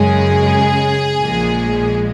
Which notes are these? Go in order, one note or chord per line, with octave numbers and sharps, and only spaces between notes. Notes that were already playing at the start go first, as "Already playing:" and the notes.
Already playing: F#2 C#3 G#3 G#4
A#1 A#2 F3 G#3